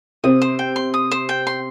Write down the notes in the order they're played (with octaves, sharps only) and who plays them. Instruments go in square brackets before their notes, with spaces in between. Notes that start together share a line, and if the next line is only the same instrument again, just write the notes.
[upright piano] C3 C4 [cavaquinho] D#6
[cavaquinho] C5
G5
C6
D#6
C5
G5
C6